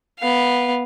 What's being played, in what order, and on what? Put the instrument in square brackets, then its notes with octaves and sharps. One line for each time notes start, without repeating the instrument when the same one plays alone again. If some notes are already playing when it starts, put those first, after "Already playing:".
[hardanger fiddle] B3 F5